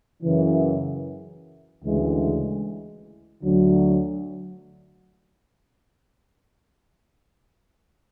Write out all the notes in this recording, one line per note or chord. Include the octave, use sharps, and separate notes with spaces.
F#2 C#3 E3
D2 C#3 E3 G#3
D2 D3 F#3